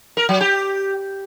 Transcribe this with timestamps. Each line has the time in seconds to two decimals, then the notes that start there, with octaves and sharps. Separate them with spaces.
0.17 A#4
0.29 F#3
0.41 G4